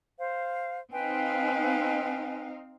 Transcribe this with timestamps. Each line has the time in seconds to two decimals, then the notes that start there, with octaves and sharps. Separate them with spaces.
0.19 C5 F5
0.92 C4 D#4 B4 F5 G5 G#5